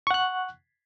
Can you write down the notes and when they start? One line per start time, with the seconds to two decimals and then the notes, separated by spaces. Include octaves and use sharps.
0.07 C#6
0.11 F#5
0.14 F#6